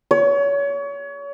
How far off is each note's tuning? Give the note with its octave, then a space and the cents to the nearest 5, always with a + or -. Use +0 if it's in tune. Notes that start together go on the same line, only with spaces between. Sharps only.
C#5 +30